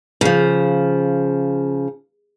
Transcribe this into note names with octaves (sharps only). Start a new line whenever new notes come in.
C#3 F3